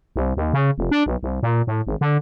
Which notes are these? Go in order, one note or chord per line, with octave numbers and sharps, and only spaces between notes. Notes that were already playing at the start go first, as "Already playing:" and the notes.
C2
D#2
C#3
F1
D4
B1
C2
A#2
A2
G#1
D3